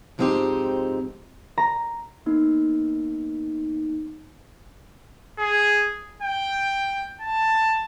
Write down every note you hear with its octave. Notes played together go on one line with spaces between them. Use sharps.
G#2 F3 G#3 C4 D#4 G4
A#5
A#3 B3 D#4
G#4
G5
A5